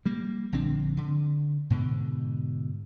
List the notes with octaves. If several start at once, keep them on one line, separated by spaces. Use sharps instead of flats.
G3 A#3
A#1 D3 C4 D4
D3
G#2 B2 D3